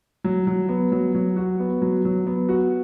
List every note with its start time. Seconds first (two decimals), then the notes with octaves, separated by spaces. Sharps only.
0.24 F#3
0.47 F#3
0.69 B3
0.92 F#3
1.15 F#3
1.37 F#4
1.60 B3
1.82 F#3
2.05 F#3
2.27 B3
2.49 F#4